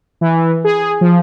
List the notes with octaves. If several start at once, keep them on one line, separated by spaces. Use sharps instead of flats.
E3
G#4
F3